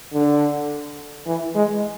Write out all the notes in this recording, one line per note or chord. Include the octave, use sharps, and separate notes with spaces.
D3
E3
G#3